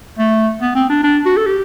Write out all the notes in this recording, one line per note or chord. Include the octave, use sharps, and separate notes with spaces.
A3
B3
C4
D4
D4
F#4
A4
G4